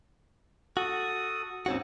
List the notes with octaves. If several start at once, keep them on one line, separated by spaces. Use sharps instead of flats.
F#4 A4 D#6
D#2 G#2 C4 C#4 F#4